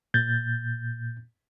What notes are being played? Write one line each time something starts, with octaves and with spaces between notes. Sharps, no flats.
A#2 G6 A6